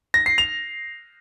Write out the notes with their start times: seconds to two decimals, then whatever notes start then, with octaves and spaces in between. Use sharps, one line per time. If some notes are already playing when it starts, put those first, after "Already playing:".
0.14 A#6
0.26 C7
0.38 F7